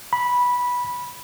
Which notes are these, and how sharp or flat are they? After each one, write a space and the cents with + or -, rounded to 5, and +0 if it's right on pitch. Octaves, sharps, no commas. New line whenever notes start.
B5 -10